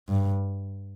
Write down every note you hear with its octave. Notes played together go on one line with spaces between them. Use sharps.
G2